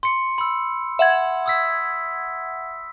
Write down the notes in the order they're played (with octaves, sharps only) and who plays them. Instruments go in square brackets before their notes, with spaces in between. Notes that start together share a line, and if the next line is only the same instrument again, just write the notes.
[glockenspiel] C6 C#7
B5 E6
[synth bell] E5 F#5 G#6
[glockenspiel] D#6 E6 B6